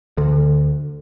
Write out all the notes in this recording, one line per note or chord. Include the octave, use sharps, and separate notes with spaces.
D2 D3